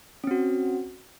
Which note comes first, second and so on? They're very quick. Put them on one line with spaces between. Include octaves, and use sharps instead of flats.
C#4 C4 F#4